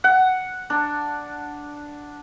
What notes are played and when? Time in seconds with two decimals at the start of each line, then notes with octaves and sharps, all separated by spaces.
0.04 F#5
0.70 D4